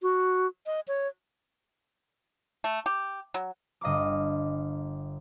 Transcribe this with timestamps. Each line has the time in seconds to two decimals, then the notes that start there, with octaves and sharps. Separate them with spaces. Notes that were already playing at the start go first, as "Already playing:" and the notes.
0.02 F#4
0.66 D#5
0.88 C#5
2.64 A3
2.86 G4
3.34 F#3
3.81 G1 D#5 F5 A#5 D6